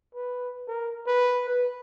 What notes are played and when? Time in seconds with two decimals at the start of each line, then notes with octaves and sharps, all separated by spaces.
0.15 B4
0.68 A#4
1.07 B4
1.48 B4